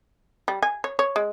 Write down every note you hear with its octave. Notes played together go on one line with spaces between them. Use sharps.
G3
G#5
C#5
C#5
G#3